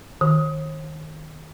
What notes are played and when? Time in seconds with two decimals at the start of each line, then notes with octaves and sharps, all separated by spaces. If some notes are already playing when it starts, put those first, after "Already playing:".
0.21 D#3